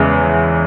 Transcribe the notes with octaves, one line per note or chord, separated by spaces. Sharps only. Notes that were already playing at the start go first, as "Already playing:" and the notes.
Already playing: E2 C#3 E3 G#3